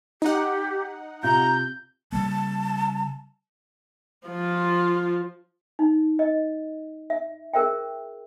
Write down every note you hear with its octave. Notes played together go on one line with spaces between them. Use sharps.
D#4 G4 F#5
C3 F4 A#5 G6
C#3 G3 A#3 A5
F3 F4
D#4
D#5
E5
G#4 A#4 C5 E5 G5